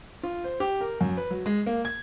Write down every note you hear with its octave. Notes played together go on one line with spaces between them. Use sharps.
F4
C5
G4
A#4
F#2
B4
F#3
G#3
A#3
G#6